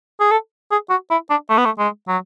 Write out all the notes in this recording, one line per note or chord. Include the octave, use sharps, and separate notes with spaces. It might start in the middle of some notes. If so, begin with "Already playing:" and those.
G#4
A4
G#4
F#4
E4
D4
A3
B3
A3
G#3
F#3